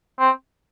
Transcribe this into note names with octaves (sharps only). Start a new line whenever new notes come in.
C4